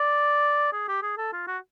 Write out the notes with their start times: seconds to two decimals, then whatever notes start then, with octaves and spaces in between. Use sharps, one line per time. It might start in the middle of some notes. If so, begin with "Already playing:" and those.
Already playing: D5
0.73 G#4
0.88 G4
1.02 G#4
1.17 A4
1.33 F4
1.47 F#4